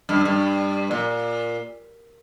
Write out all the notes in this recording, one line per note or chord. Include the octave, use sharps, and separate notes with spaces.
G2
G2
A#2